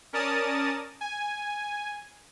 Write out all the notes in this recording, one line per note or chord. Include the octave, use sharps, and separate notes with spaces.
C#4 A#4 D5 A5 D#6 A6
G#5